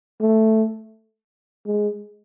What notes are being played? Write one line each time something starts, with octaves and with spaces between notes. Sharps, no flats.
A3
G#3